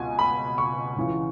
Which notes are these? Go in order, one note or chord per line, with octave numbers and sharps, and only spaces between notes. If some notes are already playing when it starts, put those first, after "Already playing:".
Already playing: C#2 B2 G#5
B5
C#6
C#2 C#3 E3